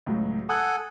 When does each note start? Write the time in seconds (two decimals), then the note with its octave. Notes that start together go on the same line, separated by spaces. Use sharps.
0.06 C#2 A2 F#3
0.49 A4 F#5 G#5 D#6 F#6